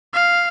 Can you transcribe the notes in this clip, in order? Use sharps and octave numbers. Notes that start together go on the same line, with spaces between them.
F5